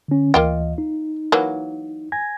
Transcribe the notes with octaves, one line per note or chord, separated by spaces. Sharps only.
D3 C#4
D2 E3 A#3 F4 D#5 G5
D#4
E3 F#3 A#3
G#5 G#6 A#6